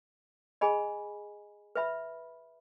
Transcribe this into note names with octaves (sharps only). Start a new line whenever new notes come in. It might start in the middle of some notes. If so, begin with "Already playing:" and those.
G#4 D#5 G#5 B5
B4 E5 B5